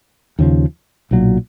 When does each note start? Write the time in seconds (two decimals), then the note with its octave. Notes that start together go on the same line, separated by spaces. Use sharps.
0.39 D#2 C#3 F3
1.11 B1 A#2 F#3